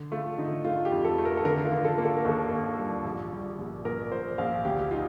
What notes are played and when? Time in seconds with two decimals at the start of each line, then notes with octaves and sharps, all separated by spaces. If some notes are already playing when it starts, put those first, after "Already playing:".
Already playing: D3
0.12 A3 F4
0.38 D3 D#4
0.64 A3 F4
0.85 G4
0.92 F2
1.05 A4
1.18 A3
1.25 A#4
1.37 A4
1.45 D3 A#4
1.65 F4
1.72 D3 A#4
1.85 A4
1.98 A#3
2.05 A4
2.17 A#4
2.25 D#2 A4
2.51 D#2
2.78 G3
3.05 A#1
3.31 G3
3.58 A#1
3.85 A#1 A#4
4.12 A#1 C5
4.38 A#1 F5
4.65 D2 G4
4.91 D#4 F4